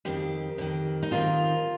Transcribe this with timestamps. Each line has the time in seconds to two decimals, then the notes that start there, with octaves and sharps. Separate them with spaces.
0.05 F2 D#3 G4
0.58 F2 D#3
1.03 D#4
1.11 F2 D#3 F4